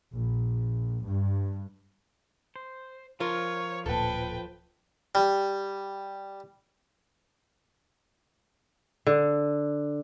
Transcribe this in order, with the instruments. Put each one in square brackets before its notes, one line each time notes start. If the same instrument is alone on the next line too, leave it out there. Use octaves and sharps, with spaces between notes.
[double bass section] A#1
G2
[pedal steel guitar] C5
[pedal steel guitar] F3 [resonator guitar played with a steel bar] F4 A#4 [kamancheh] C#5
[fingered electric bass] D1 A#2 [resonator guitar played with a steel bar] A4 [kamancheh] B4 G5
[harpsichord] G3
[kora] D3